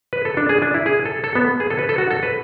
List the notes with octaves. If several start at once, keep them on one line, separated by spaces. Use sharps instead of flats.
B4
A4
D4
G#4
D4
E4
G#4
A4
A4
B3
G#4
A4
B4
A4
F#4
A4
B4